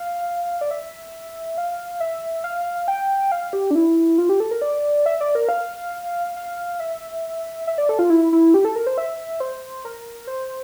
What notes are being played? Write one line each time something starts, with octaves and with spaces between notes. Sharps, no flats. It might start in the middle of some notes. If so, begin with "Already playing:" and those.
Already playing: F5
D5
E5
F5
E5
F5
G5
F5
G4
D4
E4
F4
G4
A4
A#4
D5
E5
D5
A#4
F5
F5
E5
E5
D5
A4
F4
E4
E4
G4
A4
A#4
C5
E5
C5
A#4
C5